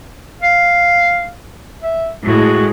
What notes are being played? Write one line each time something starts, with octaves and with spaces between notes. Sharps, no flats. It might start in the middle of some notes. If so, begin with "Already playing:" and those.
F5
E5
A2 G#3 F#4